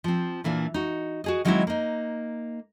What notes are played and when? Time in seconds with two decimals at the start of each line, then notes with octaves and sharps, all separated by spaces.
0.04 F3 C4
0.44 A#2 E3 A#3 D4
0.74 D#4 F#4
1.24 F#4 G#4 D#5
1.45 D#3 F#3 G#3 C4 D#4 E4
1.67 A#3 D#4